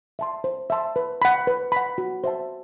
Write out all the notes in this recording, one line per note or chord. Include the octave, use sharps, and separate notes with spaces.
E5 A5 C6
C5
E5 A5 C6
B4
F#5 B5
B4
F#5 B5
F#4
C5 E5 A5